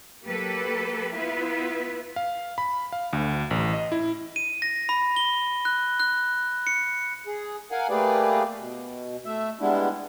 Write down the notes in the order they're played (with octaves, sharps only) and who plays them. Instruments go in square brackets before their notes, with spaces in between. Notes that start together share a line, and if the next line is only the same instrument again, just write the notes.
[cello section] F#3 A#3 G4 A4 B4
B3 E4 F4 B4 E5
[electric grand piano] F5
B5
F5
D2
A1
D#5
E4
[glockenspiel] D#7
A#6
B5
G7
F#6
F#6
C#7
[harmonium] G#4
A#4 F5 F#5 G#5
A3 A#3 G4 G#4 B4 D5
B2
A3 E5
G3 G#3 B3 D4 E4